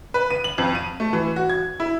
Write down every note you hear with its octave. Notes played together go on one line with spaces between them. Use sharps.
B4
D#7
F#7
F2
D#7
A3
E3
F#4
G#6
E4